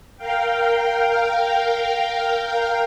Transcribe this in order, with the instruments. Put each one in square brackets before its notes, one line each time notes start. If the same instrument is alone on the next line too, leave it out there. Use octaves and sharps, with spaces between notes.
[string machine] A#4 F5 G5